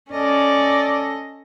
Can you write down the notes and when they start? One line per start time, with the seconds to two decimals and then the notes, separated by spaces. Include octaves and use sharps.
0.12 C#4 A4 D5 D#5